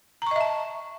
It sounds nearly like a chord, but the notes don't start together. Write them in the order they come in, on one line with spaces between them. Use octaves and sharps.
A#5 C#6 D#5 E5 A5